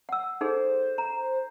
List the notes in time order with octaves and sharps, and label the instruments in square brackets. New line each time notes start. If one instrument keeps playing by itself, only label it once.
[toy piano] F#5 E6
[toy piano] D#4 G#4 A4 [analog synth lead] C5
[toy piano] A#5